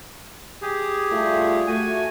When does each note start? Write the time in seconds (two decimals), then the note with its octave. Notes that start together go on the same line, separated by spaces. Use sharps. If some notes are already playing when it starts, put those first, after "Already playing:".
0.62 G4 G#4
1.10 G3 A3 F4
1.67 A3 F#4 G#5